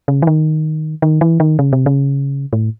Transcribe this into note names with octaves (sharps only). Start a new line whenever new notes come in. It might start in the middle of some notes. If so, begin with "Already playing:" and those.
C#3
E3
D#3
D#3
E3
D#3
C#3
C3
C#3
A2